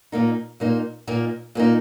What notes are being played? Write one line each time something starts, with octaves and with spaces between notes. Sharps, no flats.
A#2 A#3 D#4
A#2 A#3 D#4
A#2 A#3 D#4
A#2 A#3 D#4